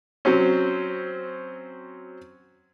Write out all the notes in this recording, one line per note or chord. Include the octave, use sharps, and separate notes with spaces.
F#3 C4 C#4